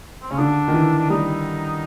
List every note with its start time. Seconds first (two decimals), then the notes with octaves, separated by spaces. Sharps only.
0.22 C4
0.31 C#3 C#4
0.38 D3 D4
0.68 D#3
0.74 E3
0.99 D4
1.10 G3 D#4